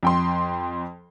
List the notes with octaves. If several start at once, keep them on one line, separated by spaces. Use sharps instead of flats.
F2 G5 C6